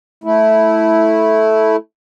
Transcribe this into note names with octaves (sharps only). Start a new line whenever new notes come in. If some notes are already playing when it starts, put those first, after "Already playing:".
A3 E4